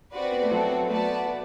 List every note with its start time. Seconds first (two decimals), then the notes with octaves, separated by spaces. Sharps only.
0.13 C4 F#4 B4 D5
0.32 B3
0.42 A3
0.51 F#3 C4 F#4 A4
0.88 A3 B3 F#4 B4 D5 A5
1.26 B3